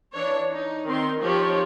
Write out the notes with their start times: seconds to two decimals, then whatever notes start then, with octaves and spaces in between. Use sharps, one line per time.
0.14 E3 D4 C#5
0.51 D#4
0.88 D#3 C4 D#4 C6
1.21 F3 D#4 G4 C#5